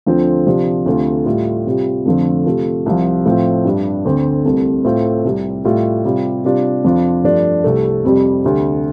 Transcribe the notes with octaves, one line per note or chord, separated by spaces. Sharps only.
D2 D3 F3 C4 F4
C3 F3 D4 F4
D2 C3 A3 F4
A2 G3 F4
C3 G3 F4
F2 D3 F3 A3
C3 A3 F4
C2 C3 F3
A2 F3 C4 F4
G2 G3 D4
D2 D3 A3 C4
C2 C3 A3
A2 A3 C4 F4
C2 C3 G3
A2 G3 F4
C3 G3 F4
C3 G3 D4 F4
F2 F3 D4 F4
G2 F3 A3 D4 F4
C2 C3 A3
F2 C3 G3
D2 C3 G3